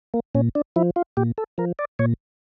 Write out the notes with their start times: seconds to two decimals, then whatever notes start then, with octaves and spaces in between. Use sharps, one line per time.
0.14 A#3
0.35 A#2 C#4
0.55 D4
0.76 F3 E4
0.96 F4
1.17 A#2 G4
1.38 A4
1.58 F3 A#4
1.79 D5
1.99 A#2 C#5